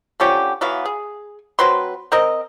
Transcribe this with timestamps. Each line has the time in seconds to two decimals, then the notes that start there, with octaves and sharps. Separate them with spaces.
0.20 D3 F3 C#4 G4
0.61 E3 F#3 B3 F5
0.86 G#4
1.59 F#3 C4 B4 C6
2.12 C4 A#4 D#5